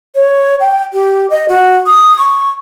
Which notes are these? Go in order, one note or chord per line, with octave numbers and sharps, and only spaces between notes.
C#5
G5
G4
D#5
F#4
D#6
C#6